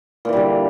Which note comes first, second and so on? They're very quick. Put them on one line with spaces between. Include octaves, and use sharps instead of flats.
A#2 E3 G3 D3